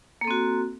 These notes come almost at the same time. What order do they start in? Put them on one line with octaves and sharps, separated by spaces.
A#3 A4 C4 F#4